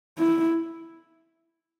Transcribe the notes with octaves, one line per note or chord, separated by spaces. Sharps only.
E4